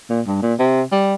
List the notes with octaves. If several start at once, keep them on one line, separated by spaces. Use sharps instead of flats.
A#2
G2
A#2
C3
G3